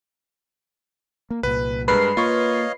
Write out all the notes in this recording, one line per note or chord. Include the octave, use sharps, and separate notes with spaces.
A#3
C2 A#2 B4
G2 G#3 A#4 B4 C7
A#3 F4 C#5 D#5 F5 C#6